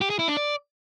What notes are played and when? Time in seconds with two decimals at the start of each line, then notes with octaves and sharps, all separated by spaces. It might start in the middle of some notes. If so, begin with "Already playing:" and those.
0.01 G4
0.10 G#4
0.19 E4
0.28 D4
0.37 D5